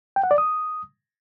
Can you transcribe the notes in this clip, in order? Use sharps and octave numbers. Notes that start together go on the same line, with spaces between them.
G5
F#5
D5
D#6